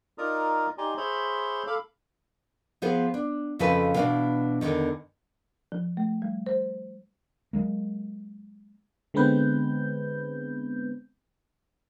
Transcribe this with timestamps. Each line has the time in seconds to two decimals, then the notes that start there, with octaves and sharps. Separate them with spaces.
0.18 D#4 F4 A#4 D5 A#5 D#6
0.78 D#4 G4 D5 G#5 A#5 C6
0.97 G#4 C5 C#5 E5 B5 C6
1.67 A4 F5 B5 D6
2.82 F3 B3 G#4 C5
3.14 D4
3.59 F2 C#3 F3 A4 B4 G#5
3.95 B2 E3 A3 C#4 D4 F5
4.61 E2 G#2 D3 D#3
5.72 F3
5.97 A3
6.22 G3
6.46 C5
7.53 F#3 G#3 A#3
9.14 D3 G#3 B3 C4 B4 G6